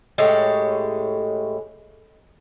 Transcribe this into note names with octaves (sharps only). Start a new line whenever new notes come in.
A2 G#3 C#4 G4